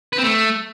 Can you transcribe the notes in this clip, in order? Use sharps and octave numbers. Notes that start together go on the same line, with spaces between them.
B4
C4
A3